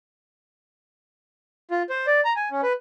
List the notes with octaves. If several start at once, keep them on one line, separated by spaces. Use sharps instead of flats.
F4
C5
D5
A#5
G#5
C#4
B4